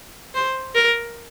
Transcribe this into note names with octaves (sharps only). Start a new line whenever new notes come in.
C5
A#4